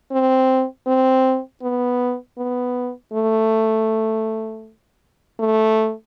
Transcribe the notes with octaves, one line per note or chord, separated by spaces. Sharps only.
C4
C4
B3
B3
A3
A3